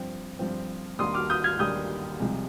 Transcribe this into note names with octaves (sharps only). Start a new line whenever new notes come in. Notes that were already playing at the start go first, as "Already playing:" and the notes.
Already playing: G2 F3 C4 G5
G2 F3 C4
D#2 D#3 G3 A#3 D4 C6 D#6
D6 F6
D#6 G6
F6 G#6
D#2 D#3 G3 A#3 D4 D#6 G6
C2 C3 F3 G#3